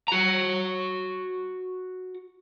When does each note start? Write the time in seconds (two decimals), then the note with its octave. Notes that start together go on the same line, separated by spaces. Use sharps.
0.08 F#4 A#5